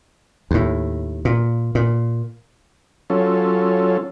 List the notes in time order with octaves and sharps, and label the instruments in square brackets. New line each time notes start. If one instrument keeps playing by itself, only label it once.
[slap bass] D#2 A2
A#2
A#2
[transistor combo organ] F#3 C#4 F4 A4